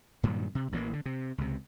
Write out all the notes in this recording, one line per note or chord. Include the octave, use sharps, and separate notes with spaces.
G2 A#2 D#3 F#3
C3
A1 E3 G3 A#3
D3
C3
C#2 C3